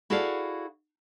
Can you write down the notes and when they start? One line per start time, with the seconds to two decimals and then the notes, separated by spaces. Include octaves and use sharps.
0.10 E4 F#4 G#4 A4 D5 F5